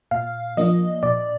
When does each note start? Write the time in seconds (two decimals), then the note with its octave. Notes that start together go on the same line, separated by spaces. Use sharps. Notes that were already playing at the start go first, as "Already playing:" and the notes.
0.11 A#2 F5
0.57 F3 A#3 D4 D#5
1.03 A#2 D5